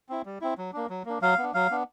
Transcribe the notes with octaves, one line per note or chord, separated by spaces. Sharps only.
C4 E4
G3
C4 E4
F#3
A#3 D4
F#3
A#3 D4
F#3 F5
B3 D4
F#3 F5
B3 D4